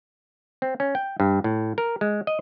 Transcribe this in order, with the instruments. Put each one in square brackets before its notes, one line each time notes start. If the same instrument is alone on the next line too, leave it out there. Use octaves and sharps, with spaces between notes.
[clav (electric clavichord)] C4
C#4
G5
G2
A2
A#4
G#3
D#5